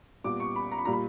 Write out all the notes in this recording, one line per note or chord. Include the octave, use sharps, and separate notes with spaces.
A#2 G3 B3 D6
C#6
B5
A#5
B5
A#2 G3 A#3 A#5
B5